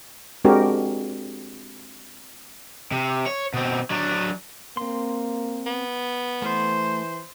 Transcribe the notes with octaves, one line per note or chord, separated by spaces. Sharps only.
G#3 C4 D4 F#4 G4 A#4
C3
C#5
B2 C4
F#3 D4
A#3 C4 C6
B3
E3 A3 C5